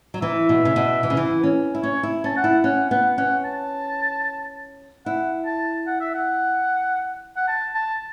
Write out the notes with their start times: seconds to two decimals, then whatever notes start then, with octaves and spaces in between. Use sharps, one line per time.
0.14 F#3
0.22 E3 E5
0.49 B2
0.65 C#3
0.76 B2
1.03 E3
1.10 C#3
1.17 E3
1.43 C#4
1.75 E4
1.83 C#4 C#5
2.03 E4
2.24 C#4 A5
2.37 F#5
2.44 E4
2.64 C#4 F#5
2.91 B3 F#5
3.18 C#4 F#5
3.45 A5
5.06 E4 F#5
5.46 A5
5.87 F#5
6.01 E5
6.14 F#5
7.37 F#5
7.48 A5
7.75 A5